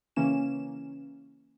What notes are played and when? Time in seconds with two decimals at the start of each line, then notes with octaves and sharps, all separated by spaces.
0.16 C#3 E3 A#3 C#4 E7